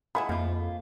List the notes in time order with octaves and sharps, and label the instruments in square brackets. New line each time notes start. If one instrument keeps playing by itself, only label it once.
[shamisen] D#3 G#3 E4 [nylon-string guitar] F#5 G#5 [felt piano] B5
[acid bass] F2 [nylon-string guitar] A#3 F4